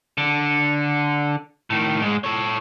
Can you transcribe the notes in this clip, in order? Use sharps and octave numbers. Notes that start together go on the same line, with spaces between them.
D3
A2 D#3
G#2 G#3
A4 C#5